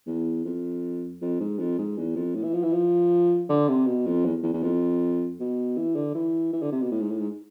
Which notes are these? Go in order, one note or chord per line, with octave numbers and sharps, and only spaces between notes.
E2
F2
F2
G#2
F2
G#2
E2
F2
A2
E3
F3
E3
F3
D3
C3
B2
F2
E2
E2
E2
F2
B2
E3
D3
E3
E3
D3
C3
B2
A2
G#2
A2
G#2